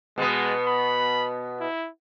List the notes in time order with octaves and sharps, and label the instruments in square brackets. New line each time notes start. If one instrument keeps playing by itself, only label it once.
[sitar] B2 B3 [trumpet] G#3
[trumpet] B5
E4